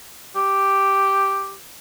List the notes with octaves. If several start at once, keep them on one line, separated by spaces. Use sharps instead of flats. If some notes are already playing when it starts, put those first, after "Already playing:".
G4